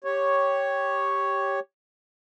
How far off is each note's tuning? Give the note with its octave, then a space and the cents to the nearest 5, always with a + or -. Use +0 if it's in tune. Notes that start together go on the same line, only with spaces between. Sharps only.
G4 +0 C#5 +0